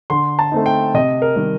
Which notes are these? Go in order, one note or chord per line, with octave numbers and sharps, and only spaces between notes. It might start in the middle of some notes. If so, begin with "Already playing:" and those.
D3 C6
A5
A3 C4 D#4
G5
C3 D#5
A#4
D#3 G3